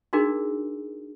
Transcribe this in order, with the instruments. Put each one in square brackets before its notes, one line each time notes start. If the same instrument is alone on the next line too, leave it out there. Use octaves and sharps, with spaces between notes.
[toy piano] D4 D#4 F#4 G#4 A#4